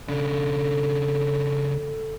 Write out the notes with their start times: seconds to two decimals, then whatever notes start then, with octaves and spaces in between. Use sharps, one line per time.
0.08 C#3 D4 A4